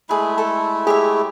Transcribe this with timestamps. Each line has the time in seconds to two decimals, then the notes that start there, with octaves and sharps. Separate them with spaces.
0.09 G#3 A3 E4 G#4 B4
0.38 A4
0.87 G4 G#4 C#5 E5